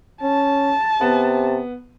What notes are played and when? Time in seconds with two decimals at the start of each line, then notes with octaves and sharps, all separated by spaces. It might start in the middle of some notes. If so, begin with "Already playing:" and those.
0.22 C#4 A5
1.01 C3 B3